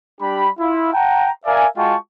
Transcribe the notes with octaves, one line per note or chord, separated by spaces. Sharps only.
G3 D4 G4 B5
E4 F4
F#5 G5 A5 A#5
A#4 D5 E5 F5 G#5
G#3 F4 F#4 G5 A5 C#6